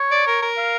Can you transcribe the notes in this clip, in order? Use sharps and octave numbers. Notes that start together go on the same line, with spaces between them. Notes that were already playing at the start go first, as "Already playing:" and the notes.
Already playing: C#5
D5
A#4
A#4
F5